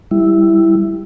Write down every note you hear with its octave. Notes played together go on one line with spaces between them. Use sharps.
G3 E4